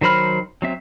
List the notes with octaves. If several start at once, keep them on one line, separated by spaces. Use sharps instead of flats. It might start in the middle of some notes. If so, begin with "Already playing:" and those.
D#3 F#3 C5 B5 F6
F#3 C4 E5